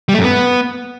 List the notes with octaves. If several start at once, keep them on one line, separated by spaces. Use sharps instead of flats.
G3
A3
F#2
B3